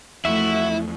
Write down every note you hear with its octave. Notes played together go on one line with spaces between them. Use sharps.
E2 F3 A3 E4 F#4 E5